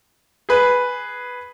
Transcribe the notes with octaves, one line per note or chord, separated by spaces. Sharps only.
G#4 B4